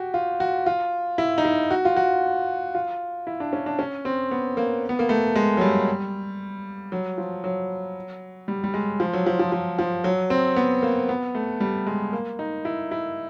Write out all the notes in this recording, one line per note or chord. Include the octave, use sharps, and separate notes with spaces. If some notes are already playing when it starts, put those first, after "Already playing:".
Already playing: F#4 G4
F4
F#4
F4
E4
D#4
E4
F#4
F4
F#4
F4
E4
D4
C#4
D4
C#4
C4
B3
A#3
B3
A#3
A3
G#3
F#3
G3
F#3
F3
F#3
G3
G3
G#3
F3
F#3
F3
F3
F3
F3
F#3
C4
B3
A#3
B3
A3
G3
G#3
A#3
D#4
E4
E4